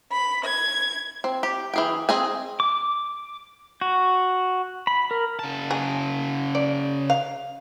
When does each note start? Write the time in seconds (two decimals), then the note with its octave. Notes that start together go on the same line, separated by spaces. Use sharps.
0.12 B5
0.45 G#6
1.24 C4
1.43 G4
1.74 E3 G#4 G5
2.09 C4 G#4 D#5 G#5
2.60 D6
3.81 F#4
4.87 B5
5.11 A#4
5.39 C#3 A5
5.71 G#4
6.55 D5
7.10 F5